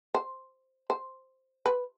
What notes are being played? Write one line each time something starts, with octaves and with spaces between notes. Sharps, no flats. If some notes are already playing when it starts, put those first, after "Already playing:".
C5
C5
B4